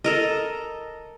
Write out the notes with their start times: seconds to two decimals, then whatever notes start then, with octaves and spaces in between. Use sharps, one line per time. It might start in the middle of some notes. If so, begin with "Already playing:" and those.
0.04 A4 A#4 D#5